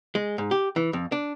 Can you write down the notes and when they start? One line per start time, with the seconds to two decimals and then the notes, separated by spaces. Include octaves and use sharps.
0.15 G#3
0.38 G#2
0.51 G4
0.76 E3
0.93 F2
1.12 D4